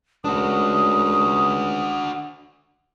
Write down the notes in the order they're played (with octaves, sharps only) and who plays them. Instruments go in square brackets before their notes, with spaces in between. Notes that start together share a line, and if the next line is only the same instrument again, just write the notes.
[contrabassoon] C#2 [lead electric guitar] D4 F#4 [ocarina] D#6